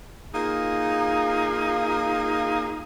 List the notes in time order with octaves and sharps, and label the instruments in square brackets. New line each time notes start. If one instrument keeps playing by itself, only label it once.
[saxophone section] A#3 D#4 F4 G#4